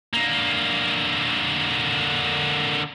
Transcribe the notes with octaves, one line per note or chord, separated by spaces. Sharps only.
D3 A#3